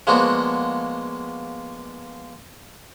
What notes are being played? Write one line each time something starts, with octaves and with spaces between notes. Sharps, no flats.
F3 G#3 A#3 B3 D4 F#4